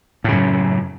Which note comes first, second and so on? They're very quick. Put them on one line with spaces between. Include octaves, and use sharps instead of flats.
A2 C#3 F#2